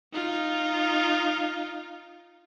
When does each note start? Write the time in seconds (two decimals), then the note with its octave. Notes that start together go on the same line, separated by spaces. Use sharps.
0.13 D#4 F4